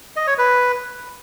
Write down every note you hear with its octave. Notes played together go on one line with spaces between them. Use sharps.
D#5
C#5
B4